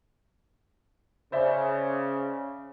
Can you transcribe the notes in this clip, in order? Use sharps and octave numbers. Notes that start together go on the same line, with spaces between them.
C#3 C5 D5 E5